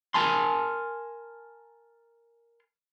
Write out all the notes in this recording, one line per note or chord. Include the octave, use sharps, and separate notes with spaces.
A#4 G#5 A5 C6